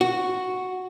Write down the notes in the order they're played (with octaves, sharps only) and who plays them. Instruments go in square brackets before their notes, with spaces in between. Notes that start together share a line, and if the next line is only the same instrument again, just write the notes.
[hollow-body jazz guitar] F#4